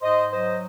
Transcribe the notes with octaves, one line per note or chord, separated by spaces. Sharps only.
G#2 C5 D#5
F#3 C5 D#5